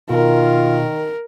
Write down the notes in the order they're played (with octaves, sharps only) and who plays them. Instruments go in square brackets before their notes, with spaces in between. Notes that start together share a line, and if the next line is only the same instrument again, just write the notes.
[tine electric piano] B2 [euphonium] D#3 [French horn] F4 [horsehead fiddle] A#4